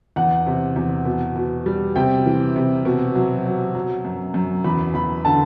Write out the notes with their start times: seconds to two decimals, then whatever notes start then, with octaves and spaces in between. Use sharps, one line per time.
0.16 E2 F#5
0.47 C3
0.76 E2
1.05 B2
1.36 B2
1.66 G3
1.96 C3 G5
2.26 E3
2.56 C3
2.85 B2
3.15 F#3
3.46 F#3
3.75 F#3
4.05 F#2
4.34 F#2
4.64 E2 B5
4.94 E2 B5
5.25 D3 A5